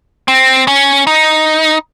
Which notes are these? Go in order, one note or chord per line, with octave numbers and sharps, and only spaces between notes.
C4
C#4
D#4